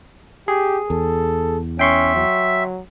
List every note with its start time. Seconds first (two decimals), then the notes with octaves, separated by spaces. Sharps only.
0.48 G4 G#4
0.90 E2 A4
1.79 C#4 E5 G5 C6 C#6
2.15 F#3